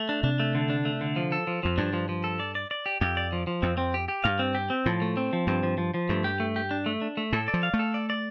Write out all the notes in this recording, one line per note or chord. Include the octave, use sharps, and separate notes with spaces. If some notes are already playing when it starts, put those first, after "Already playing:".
Already playing: A3
D4
C3 D4
A3
D3
D4
A3
D3
F3
A4
F3
F2 F3
G2 D4
F3
F3
A4
D5
D5
D5
G4
F2 G4
D5
F3
F3
F2 C4
C4
G4
G4
G2 F5
C4
G4
C4
A2 F3
A3
C4
F3
G2 C4
F3
F3
F3
G2 A3
G4
A3
G4
D4
A3
D4
A3
A2 A4
D5
F3
F5
A3
A4
D5
D5